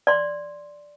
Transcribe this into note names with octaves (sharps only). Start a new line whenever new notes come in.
D5 C6